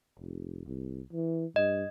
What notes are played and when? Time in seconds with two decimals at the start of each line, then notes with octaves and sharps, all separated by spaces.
0.20 F1
0.67 C2
1.13 E3
1.56 G2 D#5